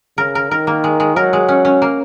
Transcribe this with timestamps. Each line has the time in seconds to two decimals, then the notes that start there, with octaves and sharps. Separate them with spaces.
0.18 C#3 A#4
0.35 A#4
0.51 D#3 A#4
0.67 A#3
0.84 G#3
1.00 G#3
1.16 F#3 A#4
1.33 G#3
1.49 C#4
1.65 C#4
1.82 A#3